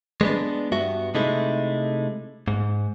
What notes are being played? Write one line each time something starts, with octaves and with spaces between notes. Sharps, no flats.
G#3 B3 D4
G2 B3 F#4 E5
C3 G#3 A3 D#4 E4
G#2